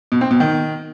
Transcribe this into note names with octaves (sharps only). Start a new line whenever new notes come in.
B2
C4
B2
D#3